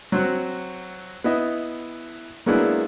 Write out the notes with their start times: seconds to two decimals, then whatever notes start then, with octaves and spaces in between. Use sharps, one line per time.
0.12 F#3 C4 F#4
1.24 B3 E4 D#5 E5
2.46 F#3 G#3 A#3 B3 D4 E4